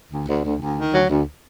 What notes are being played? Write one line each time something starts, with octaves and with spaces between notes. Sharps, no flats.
D2
D2
D2
D2
D#3
D2 F#3
D2